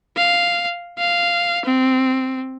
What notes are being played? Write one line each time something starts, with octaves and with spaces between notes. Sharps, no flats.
F5
F5
C4